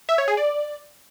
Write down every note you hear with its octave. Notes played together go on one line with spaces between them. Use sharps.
E5
C#5
G#4
D5